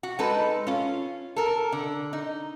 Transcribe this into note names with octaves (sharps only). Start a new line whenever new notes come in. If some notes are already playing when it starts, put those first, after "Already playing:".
F#4
G#3 D#4 A4 B4
C#4 F4
A4 A#4
D3
D#4